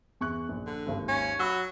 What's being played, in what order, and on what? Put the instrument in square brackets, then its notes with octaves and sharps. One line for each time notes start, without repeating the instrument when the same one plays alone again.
[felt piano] E2 C#6 F#6
A#1
[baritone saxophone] D3
[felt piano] G#1 D#2
[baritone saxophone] C#4
[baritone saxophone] F#3 [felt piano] B5 C#6 E6